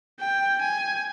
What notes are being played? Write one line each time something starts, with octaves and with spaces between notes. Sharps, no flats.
G5
G#5